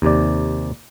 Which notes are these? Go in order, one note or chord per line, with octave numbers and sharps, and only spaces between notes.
D#2 C3 D5